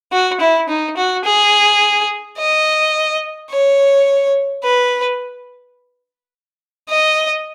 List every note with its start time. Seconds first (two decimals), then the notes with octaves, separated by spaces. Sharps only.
0.12 F#4
0.40 E4
0.69 D#4
0.97 F#4
1.25 G#4
2.38 D#5
3.50 C#5
4.64 B4
6.89 D#5